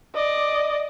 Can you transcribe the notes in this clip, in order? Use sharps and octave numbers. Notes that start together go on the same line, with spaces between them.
D5 D#5